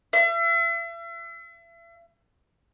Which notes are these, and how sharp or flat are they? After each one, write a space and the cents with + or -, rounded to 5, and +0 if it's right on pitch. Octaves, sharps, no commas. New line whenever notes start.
E5 +40